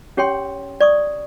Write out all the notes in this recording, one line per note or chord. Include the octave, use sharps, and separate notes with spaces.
C#4 G4 C#5 G5 C6
D5 C#6 D#6